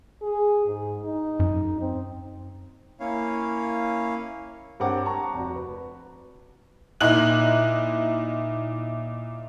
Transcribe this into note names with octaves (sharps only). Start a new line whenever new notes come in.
G#4
G#2
D#4
F#2
C4
A#3 C#4 E4 C#5 F5
G2 C4 A#4 C#5 F#5 D6
A5 A#5 C#6
F1 F#4
B4
A#2 D#4 E4 F#6 F#7